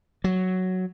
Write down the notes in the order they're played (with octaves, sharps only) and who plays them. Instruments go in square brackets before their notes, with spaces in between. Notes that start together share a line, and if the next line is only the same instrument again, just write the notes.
[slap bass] F#3